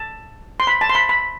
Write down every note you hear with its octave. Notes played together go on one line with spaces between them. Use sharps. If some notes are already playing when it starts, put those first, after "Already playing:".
Already playing: A5
C6
B5
A5
C6
B5
B5